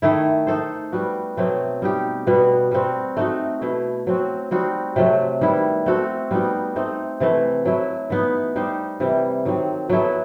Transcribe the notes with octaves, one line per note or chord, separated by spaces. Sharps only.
D#3 A3 E4
A3 D#4 A4 C5
G3 B3 F#4
B2 F#3 A3 C4
G3 D#4 G4
B2 G3 B3 F#4
G3 C4 F#4
A3 D#4 F#4
B2 A3 E4
F#3 C4 F#4
G3 C4 D#4 F#4
C3 F#3 A3
D#3 G3 B3 E4
A3 C4 F#4 A4
G3 B3 D#4 F#4
A3 C4 D#4
C3 E3 A3
F#3 A3 E4
E3 B3 D#4
G3 D#4 G4 C5
C3 E3 G3
D#3 F#3 C4
F#3 B3 E4 A4